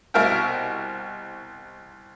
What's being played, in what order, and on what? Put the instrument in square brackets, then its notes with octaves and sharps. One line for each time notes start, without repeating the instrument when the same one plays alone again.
[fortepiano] C2 B2 A#4 E5 F5 G5